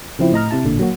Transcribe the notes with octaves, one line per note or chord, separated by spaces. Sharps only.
C#3 F3 C4 E4
A2 D#5 A#5 F6
C3 E4 A5
A1 A#2 D3
F#3 A#3 F#4